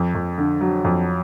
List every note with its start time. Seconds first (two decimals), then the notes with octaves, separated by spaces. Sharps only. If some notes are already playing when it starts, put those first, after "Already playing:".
Already playing: F2
0.14 F2
0.38 D3
0.61 F#3
0.84 F2